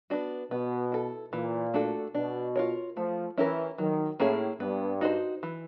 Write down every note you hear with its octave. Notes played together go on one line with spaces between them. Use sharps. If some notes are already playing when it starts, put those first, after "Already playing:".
B3 D4 F#4
B2 B3
E4 A4
A#2 E3
A3 D4 F#4 A4
B2 D4
F4 A#4 C#5
F3 A3
E3 C#4 E4 G4 A#4
D#3 F#3
A2 A#3 C#4 E4 G#4
G2 B3
D#4 F#4 A4 C5
E3